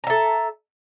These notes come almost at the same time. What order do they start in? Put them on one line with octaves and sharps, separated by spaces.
A#5 E5 A4